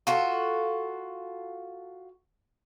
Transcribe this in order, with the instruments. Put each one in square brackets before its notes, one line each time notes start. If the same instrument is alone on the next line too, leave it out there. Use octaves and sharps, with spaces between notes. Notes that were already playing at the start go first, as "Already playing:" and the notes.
[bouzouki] F4 F#4 A4